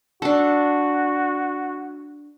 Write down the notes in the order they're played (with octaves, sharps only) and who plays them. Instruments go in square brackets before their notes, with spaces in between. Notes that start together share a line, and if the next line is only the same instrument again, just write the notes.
[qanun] D4 A4 [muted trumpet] F#4